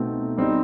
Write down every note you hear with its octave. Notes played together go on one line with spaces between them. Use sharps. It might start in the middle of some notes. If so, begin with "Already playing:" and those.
Already playing: B2 A3 C4 D#4
G3 C4 D#4